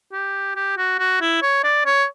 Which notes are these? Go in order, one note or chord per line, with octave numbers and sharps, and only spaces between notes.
G4
G4
F#4
F#4
E4
C#5
D5
C#5